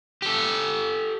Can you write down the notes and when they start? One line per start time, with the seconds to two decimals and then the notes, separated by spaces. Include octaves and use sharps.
0.22 G4 A4